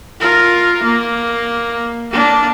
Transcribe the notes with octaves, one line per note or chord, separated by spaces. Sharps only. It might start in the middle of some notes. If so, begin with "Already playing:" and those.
F4 A#4
A#3
A#3 D4